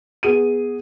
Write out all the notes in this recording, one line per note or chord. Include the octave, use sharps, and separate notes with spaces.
B3 G#4 D#7